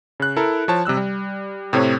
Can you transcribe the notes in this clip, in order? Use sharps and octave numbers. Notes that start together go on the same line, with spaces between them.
C#3 F#6
E4 A4 A#4
F3 C#5 A5
C3 G3 E6 F#6
G3
A2 C3 A3 C4 C#5